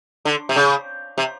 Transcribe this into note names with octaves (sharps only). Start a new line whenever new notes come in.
D3
C3
C#3
C3